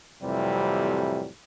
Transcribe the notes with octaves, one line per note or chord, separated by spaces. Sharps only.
F2 A2 C3 E3 F#3 G3